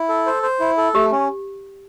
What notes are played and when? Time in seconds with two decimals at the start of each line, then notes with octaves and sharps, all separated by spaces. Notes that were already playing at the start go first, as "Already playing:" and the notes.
Already playing: E4
0.09 A4
0.26 C5
0.43 C5
0.60 E4
0.77 A4
0.95 A3 G4
1.12 C#4